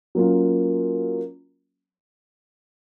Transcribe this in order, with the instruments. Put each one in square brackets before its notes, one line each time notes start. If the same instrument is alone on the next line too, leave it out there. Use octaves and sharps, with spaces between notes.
[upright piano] F#3 A#3 C#4 F4